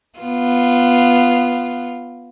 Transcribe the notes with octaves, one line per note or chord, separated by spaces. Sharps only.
B3 F4